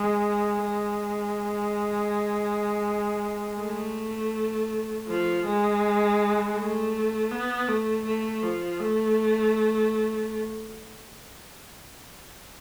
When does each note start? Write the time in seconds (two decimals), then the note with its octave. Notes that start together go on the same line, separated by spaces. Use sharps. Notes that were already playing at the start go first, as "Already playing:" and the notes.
Already playing: G#3
0.63 G#3
3.60 A3
5.08 F3
5.46 G#3
6.57 A3
7.31 B3
7.68 A3
8.06 A3
8.43 F3
8.80 A3